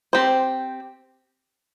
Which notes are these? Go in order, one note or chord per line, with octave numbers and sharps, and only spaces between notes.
C4 G4 C5